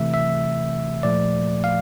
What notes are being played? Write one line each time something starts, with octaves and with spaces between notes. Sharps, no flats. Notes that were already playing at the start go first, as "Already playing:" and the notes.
Already playing: C3 E3 A3 E5
E5
A#2 F3 A3 D5
F5